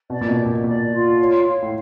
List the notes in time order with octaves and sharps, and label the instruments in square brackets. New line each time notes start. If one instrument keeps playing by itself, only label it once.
[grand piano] B2 [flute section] D5
[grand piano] A#2
B2
[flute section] G4
[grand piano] A#2
[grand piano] A#2 [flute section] D5
[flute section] F4
C#5
F5
[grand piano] A2